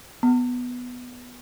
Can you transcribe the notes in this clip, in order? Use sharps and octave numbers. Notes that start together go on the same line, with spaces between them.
B3